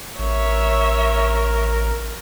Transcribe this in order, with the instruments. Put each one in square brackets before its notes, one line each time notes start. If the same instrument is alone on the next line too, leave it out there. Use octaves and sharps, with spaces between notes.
[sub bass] A1 [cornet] A#4 [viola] C#5 E5